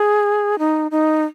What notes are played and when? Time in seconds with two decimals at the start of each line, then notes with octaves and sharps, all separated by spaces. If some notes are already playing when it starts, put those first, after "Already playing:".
Already playing: G#4
0.59 D#4
0.91 D#4